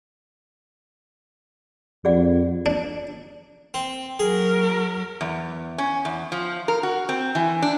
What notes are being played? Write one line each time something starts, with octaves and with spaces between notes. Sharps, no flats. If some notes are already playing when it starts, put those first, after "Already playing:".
F2 G#4 D5 F#5
D4
C4
F#3 G#4 A#4
E2
C#4
E2
F3
A#4
F#4
C4
E3
D4